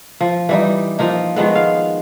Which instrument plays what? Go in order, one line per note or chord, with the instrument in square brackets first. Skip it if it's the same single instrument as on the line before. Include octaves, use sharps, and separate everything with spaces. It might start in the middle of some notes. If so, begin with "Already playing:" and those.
[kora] F3
E3 G3 D#4
F3 A#3 D#4
D#3 F3 G#3 B3
F5